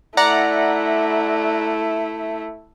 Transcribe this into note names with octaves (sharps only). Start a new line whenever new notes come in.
A3 E4 D5 F#5 A#5